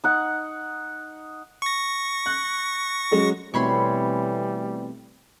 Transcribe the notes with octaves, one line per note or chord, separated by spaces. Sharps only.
D#4 F#5
C#6 A#6
F#6
F#3 G#3 C#4
B2 E3 G3 A3 C4 C#5 B5 C6